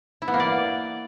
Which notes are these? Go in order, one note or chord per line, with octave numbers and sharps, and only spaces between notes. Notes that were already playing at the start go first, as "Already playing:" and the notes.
E4
B3
A#3
D5